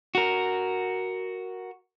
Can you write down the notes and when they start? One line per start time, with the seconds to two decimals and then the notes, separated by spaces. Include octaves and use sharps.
0.15 F#4 A#4